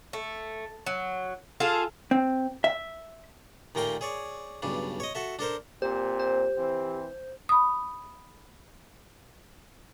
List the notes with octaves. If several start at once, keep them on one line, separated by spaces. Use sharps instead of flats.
A3
F#3
F4 G#4 A4 F5
C4
E5
D#2 A#2 A3 A#4 G5 C6
G#4 C#5 D5
B1 G2 C#3 D4
C#5 D#5
F#4 A4 E5
D4 A4 A#4 C5
A#2 C4 G4 C5
C5
E3 C4
B5 D#6